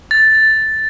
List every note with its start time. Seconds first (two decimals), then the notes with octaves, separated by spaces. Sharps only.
0.11 A6